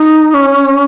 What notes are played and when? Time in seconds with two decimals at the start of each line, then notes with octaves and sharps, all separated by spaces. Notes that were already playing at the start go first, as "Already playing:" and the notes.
Already playing: D#4
0.34 C#4